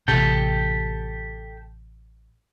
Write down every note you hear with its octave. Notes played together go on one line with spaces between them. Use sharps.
A1 C3 G4 A4 G5